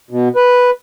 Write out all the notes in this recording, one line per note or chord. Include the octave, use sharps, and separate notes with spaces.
B2
B4